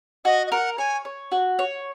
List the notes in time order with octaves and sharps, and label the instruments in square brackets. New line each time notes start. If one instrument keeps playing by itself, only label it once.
[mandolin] F#4 [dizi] D#5
[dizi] D#5
[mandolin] A#4 [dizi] F#5
[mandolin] C#5 [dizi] G#5
[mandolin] C#5
F#4
C#5